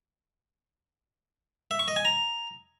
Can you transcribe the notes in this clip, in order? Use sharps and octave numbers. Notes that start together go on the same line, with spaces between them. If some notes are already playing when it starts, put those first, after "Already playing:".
E5
C#6
D#5
G#5
A#5